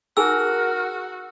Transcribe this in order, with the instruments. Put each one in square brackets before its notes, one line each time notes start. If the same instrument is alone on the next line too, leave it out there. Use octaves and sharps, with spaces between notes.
[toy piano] D#4 G#4 G#5 [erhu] F#4 [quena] A#4 [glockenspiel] E6